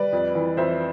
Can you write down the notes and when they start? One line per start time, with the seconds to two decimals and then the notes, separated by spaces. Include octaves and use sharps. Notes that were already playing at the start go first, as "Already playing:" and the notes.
Already playing: G3 B4 D5
0.12 F2
0.35 E3
0.57 F2 C5 E5